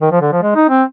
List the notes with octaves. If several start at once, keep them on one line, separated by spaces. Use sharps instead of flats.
D#3
F3
D3
F3
G#3
D#4
C4